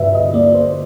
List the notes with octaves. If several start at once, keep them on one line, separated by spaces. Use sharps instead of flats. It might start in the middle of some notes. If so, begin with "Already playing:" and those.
Already playing: G2 D3 B4 E5
D#5
A#3 D5
C5